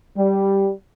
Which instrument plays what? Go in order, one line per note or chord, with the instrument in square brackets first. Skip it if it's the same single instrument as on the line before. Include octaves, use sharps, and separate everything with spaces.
[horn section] G3